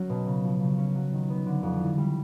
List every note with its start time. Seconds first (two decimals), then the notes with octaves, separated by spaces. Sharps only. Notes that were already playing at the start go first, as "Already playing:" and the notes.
Already playing: F#3 C#4
0.10 B2
0.26 C#3
0.44 F3
0.60 C#3
0.78 C#4
0.95 F#3
1.13 D#3
1.30 B3
1.46 D3
1.63 F2
1.80 E3
1.98 G3